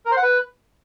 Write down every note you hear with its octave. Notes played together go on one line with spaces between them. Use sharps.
A#4
C5
F#5
B4